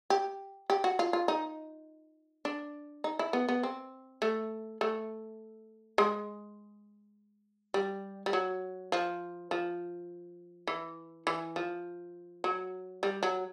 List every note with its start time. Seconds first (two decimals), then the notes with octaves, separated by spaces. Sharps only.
0.10 G4
0.70 G4
0.84 F#4
0.99 F4
1.13 F4
1.28 D#4
2.45 D4
3.04 D#4
3.19 E4
3.33 B3
3.48 B3
3.63 C4
4.22 A3
4.81 A3
5.98 G#3
7.74 G3
8.26 G3
8.33 F#3
8.92 F3
9.51 F3
10.67 E3
11.27 E3
11.56 F3
12.44 F#3
13.03 G3
13.23 F#3